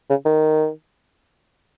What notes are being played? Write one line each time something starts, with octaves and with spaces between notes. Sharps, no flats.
C#3
D#3